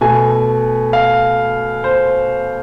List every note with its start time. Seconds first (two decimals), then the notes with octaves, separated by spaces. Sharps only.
0.01 B2 A3 G#5
0.93 F5
1.84 C5